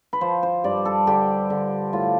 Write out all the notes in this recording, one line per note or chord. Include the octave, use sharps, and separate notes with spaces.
B4
F3 C5
C5
G2 D5
A4
D3 G4
D3
A2 F4